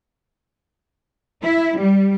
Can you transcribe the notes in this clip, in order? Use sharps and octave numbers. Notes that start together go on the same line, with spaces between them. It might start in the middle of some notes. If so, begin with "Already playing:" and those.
E4
G3